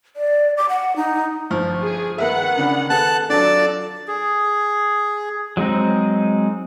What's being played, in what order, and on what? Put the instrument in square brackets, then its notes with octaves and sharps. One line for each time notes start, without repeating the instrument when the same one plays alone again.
[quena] D5
D6
F#5
D#4
[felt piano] G1 F3 F6
[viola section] G#4
[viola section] D#3 F#5 [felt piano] B3 A#4 E5
[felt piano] C#3 D4 B5
[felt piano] B3 G#4 A4 [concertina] A5 F#6
[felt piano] F#3 D4 [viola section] F4 A4 A5 [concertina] D5
[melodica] G#4
[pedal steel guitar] F#3 G#3 C4 D#4